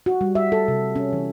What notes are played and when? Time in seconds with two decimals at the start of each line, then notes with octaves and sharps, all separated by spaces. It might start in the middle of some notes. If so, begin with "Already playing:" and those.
0.06 F#4
0.21 G3
0.35 E5
0.52 A4
0.68 C3
0.96 C#4
1.13 E3